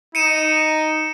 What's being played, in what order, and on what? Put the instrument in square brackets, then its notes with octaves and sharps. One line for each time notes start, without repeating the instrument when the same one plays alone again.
[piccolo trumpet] D#4 [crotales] C#7 D#7 E7